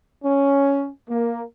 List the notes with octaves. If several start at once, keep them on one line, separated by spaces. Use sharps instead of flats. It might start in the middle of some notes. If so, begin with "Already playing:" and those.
C#4
A#3